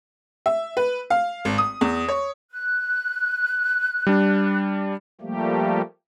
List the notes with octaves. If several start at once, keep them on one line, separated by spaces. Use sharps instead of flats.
E5
B4
F5
G#1
D#6
E2
C#5
F#6
G3 D4
F3 G3 A3 A#3 G4